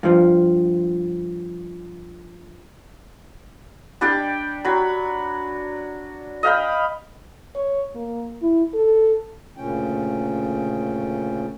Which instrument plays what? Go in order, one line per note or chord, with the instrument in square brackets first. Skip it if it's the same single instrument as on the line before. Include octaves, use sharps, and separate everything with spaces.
[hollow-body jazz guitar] G2 F3
[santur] G3 D4 G4 G5
F#3 B5
D#5 F5 G5 B5
[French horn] C#5
A#3
E4
A4
[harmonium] D2 A#2 C#3 C#4 G5